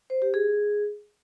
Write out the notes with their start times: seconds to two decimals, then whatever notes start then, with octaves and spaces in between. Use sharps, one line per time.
0.10 C5
0.22 G4
0.34 G#4